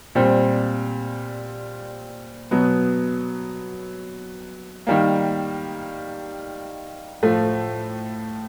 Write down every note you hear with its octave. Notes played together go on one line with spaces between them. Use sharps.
A#2 G3 C4
B2 F#3 B3
D#3 G3 A#3
A2 F3 A3